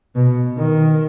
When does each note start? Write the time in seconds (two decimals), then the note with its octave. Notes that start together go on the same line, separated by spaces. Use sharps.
0.15 B2
0.58 D#3